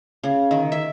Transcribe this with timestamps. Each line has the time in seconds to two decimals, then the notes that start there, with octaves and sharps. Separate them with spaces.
0.24 C#3
0.51 D#3
0.72 E5